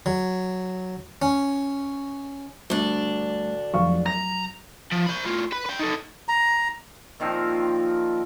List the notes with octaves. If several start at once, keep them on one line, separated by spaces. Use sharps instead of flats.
F#3
C#4
D2 G3 A3 D4
F1 F#3 F5 C#6
A#5 A#6
F3
C5 B5
A2 F4
B4
B4 G5
D#4 A4
A#5
A#2 D#3 F3 C4